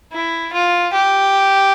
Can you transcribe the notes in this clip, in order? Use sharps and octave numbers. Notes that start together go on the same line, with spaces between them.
E4
F4
G4